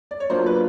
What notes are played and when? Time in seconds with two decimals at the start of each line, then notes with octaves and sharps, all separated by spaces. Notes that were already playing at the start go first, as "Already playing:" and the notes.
0.11 D5
0.20 C#5
0.30 F#3 A#3 D4 F4 C5
0.46 B4